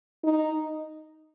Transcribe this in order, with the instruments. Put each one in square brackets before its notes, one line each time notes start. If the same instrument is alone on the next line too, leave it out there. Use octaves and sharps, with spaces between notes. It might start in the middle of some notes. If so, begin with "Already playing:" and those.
[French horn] D#4